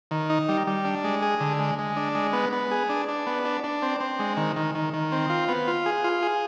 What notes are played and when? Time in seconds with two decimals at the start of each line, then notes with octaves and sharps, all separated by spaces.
0.11 D#3
0.30 D#4
0.49 G3
0.67 G3
0.85 D4
1.04 G#3
1.22 G#4
1.40 D3
1.59 G#3
1.78 G#3
1.97 D4
2.15 G#3
2.33 B3
2.53 B3
2.71 G#4
2.89 D4
3.08 D4
3.27 B3
3.45 D4
3.64 D4
3.82 C4
4.00 C4
4.19 G#3
4.37 D#3
4.56 D#3
4.75 D#3
4.93 D#3
5.12 C4
5.30 F4
5.48 B3
5.67 F4
5.86 G#4
6.04 F4
6.23 G#4